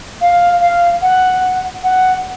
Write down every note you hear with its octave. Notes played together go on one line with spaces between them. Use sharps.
F5
F5
F#5
F#5